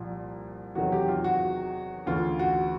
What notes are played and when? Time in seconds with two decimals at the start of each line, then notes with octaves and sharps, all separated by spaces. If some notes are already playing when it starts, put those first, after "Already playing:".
Already playing: C2 A#2 F3
0.75 E2 C3 D#3 F#3 F#4
0.92 G4
1.08 F4
1.24 F#4
2.06 D2 C#3 E3 F4
2.39 F#4